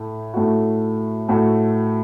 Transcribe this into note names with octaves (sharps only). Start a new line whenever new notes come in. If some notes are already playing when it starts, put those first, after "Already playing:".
Already playing: A2 A3
A2 A3 F#4
A2 A3 F#4